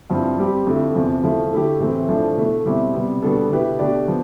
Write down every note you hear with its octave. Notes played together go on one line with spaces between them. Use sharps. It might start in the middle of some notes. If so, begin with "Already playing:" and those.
G2 F3 C4 E4
G3 C4 G4
F2 D3 A3 E4
E2 C3 F3
F3 A3 E4
D3 A3 E4 G4
A2 E3 A3 C4
A2 F3 A3 D4
B2 A3 E4
B2 G3 C4 E4 G4
C3 G3 B3
B2 G3 B3 D4 A4
B2 B3 E4 G4 B4
B2 A3 D4 G4 D5
F3 B3